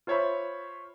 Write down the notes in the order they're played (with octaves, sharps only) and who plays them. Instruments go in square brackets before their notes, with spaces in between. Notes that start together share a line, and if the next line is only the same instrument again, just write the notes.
[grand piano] F4 C5 C#5 E5 B5